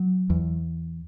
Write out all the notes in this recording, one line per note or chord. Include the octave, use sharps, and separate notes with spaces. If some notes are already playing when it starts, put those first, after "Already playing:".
Already playing: F#3
E2